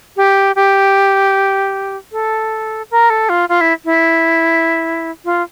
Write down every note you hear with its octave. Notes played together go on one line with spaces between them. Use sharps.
G4
G4
A4
A#4
A4
F4
F4
E4
E4
F4